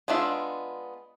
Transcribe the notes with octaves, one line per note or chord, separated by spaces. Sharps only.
G#3 B3 D4 F4 E5